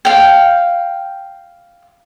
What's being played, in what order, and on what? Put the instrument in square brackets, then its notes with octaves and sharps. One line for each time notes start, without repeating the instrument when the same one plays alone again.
[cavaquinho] F5 G5